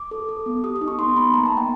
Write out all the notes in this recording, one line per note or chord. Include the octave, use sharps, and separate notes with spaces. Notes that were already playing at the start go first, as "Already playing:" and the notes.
Already playing: D6
A4
A4
B3
G4 D#6
D#6
D#4
C#6
B3 C6
B3 B5
A#3 A#5
A5
A#3
G5